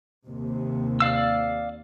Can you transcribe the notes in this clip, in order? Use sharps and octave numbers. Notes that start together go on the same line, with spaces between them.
D#2 C3
D5 F5 E6